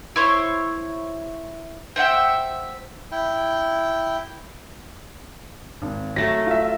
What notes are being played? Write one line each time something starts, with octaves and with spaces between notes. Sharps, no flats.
E4 C5 C#5
C5 E5 F#5 G5
E4 G5
G#1
F#3 A3 A4 A#6
F4 E5